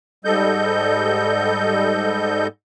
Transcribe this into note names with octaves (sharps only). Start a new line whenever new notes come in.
G#2 G3 A4 D#5 G6